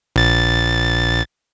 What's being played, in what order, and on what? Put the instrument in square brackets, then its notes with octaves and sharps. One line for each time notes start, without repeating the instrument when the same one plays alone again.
[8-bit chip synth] A#1 A6